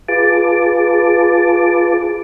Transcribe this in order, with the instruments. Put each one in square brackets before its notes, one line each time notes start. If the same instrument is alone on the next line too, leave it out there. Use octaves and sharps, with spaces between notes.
[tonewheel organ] F4 G#4 B4 A5 D6